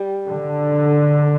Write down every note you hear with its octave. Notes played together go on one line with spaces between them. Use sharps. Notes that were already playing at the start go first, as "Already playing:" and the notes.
Already playing: G3
D3